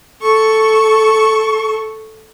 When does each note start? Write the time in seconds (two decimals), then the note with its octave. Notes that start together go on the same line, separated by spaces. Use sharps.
0.22 A4 C#6